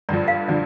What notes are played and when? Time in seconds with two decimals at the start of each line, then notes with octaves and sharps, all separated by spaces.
0.09 G2 D3 F3 D5
0.28 F5
0.48 D3 F3 D5